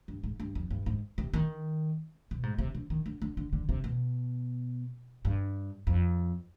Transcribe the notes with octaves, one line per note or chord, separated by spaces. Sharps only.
G2
G#2
G2
F2
G2
G#2
C3
D#3
B2
G#2
C3
D3
D#3
D3
D3
D3
D3
C3
B2
G2
F2